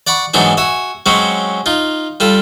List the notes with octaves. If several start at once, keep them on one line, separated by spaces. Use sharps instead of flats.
D5 F#5 B5 C#6
G#2 E3 F#3 B3 D4 D#4
F#4 E5 G#5
F#3 G#3 C4 C#4 F#4
D#4 F4
G3 F4 A4